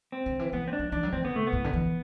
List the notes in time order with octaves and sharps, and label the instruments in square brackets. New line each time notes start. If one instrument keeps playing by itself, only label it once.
[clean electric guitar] C4
[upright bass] D3
E3
[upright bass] E3 [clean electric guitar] B3
[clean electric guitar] C4
D4
[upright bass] F#3
[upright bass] E3 [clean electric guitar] D4
[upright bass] F#3
[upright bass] E3 [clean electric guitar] C4
[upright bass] D3 [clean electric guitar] B3
[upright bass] C3 [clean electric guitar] A3
[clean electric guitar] B3
[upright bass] A2
D3
E3